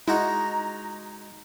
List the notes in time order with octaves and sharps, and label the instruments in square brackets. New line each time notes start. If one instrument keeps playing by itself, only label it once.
[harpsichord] G#3 D#4 F#4 [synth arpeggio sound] E4 [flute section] A#5